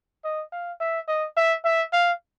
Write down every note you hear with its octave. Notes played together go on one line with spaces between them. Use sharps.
D#5
F5
E5
D#5
E5
E5
F5